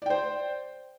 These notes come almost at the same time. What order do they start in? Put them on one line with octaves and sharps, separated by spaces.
D5 G5 C5